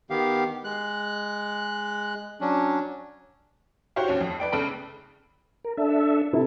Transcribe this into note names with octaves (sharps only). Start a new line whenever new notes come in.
D#3 B3 G4 F5
G#3 F#6
F#3 C#4 D4
F#4 G4 C5 C#5 F5
D#2 C#4
F2
B4 D5 G5
F#1 C#3 A4 B5 D7
A#4
D4 A4 E5
C3 E4 A4